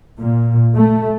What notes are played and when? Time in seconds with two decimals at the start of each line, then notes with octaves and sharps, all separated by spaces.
0.19 A#2
0.77 A3